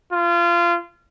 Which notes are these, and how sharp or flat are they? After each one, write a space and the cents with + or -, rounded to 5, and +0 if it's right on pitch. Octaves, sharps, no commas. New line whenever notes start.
F4 -25